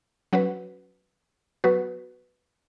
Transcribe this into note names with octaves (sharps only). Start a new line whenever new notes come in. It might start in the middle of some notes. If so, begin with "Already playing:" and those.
F#3 C#4 F#4 B4
F#3 B3 F#4 B4